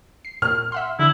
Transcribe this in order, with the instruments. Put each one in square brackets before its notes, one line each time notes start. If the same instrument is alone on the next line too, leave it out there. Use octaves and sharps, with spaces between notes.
[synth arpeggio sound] C7
[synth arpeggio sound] A#2 [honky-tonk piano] F6
[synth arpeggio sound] E5 F#5 C6
[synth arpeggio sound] D3 [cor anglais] E4